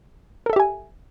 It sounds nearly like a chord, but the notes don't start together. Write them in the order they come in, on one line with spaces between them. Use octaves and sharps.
A#4 A4 E5 G4 G#5